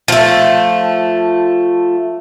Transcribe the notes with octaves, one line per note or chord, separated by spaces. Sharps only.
F3 A3